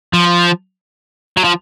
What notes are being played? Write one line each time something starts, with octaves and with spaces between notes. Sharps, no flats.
F3
F#3
F3